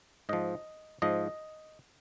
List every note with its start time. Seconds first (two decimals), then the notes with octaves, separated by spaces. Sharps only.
0.29 G#2 F3 D#5
1.02 G#2 F3 D#5